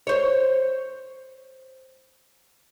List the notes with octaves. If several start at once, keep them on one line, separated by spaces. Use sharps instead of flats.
C5 C#5